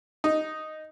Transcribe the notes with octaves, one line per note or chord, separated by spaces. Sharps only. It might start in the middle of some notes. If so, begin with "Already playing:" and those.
D#4